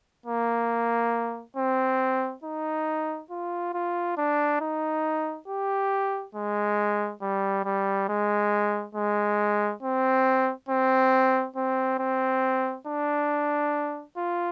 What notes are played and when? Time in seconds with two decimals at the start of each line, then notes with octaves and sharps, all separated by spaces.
0.26 A#3
1.57 C4
2.44 D#4
3.30 F4
3.74 F4
4.18 D4
4.61 D#4
5.48 G4
6.35 G#3
7.22 G3
7.65 G3
8.09 G#3
8.95 G#3
9.83 C4
10.69 C4
11.56 C4
11.99 C4
12.87 D4
14.17 F4